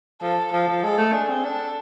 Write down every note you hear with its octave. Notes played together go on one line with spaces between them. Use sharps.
F3 A4
F3 A4
F3
G#3 A4
A3
D4 G#4
C4
D4 A4